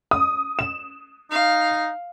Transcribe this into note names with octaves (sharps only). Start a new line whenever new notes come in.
D#6
E7
D#4 F5